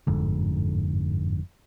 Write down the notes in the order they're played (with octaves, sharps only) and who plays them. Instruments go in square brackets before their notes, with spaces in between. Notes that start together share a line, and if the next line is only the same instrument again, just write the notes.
[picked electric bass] G1 F2 G#2 D3